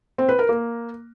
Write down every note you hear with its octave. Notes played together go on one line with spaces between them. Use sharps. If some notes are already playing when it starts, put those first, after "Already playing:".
C4
B4
A#4
A#3